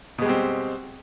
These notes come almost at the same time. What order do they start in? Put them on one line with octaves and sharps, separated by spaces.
B2 G#3 G3 C4